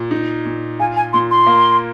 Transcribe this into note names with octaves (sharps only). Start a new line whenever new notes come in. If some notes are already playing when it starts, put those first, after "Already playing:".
Already playing: A#2
D#4
A#2
F4 G#5
G#5
A#2 C6
C6
A#3